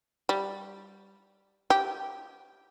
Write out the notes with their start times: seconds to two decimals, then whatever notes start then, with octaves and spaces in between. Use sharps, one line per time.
0.29 G3
1.70 G4